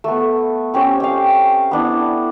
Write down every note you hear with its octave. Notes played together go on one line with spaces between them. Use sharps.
A3 B3
C4 C#4 G4
F5 G5
B3 D4 E4